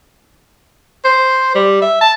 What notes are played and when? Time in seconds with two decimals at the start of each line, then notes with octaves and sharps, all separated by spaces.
1.05 C5
1.55 G3
1.82 E5
2.01 A5